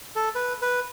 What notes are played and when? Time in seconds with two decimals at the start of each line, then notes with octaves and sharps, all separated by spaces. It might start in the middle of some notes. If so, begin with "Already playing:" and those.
0.16 A4
0.35 B4
0.62 B4